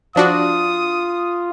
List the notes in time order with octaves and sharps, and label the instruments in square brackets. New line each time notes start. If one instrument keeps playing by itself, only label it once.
[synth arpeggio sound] F3 D4 F#4 [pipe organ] F4 [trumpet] D#6